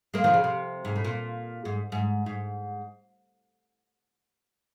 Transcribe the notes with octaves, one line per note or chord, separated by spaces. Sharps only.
G#3 A#3
D#3 F3
C#3
C3
G#2
A2
A#2
G#2
G#2
G#2